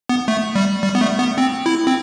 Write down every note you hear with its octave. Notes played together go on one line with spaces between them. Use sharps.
B3
A3
G3
G3
B3
A3
B3
C4
E4
C4